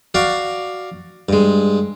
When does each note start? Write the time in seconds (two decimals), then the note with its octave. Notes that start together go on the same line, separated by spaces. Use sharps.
0.14 F#4 D5 F5
1.29 G2 G#3